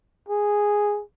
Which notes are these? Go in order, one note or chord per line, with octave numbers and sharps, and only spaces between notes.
G#4